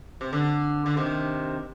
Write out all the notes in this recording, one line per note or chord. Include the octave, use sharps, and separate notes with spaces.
C3
D3
D3
C3 D#3